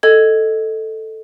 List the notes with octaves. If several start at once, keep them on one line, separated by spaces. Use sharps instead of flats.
A4 D#5 G#6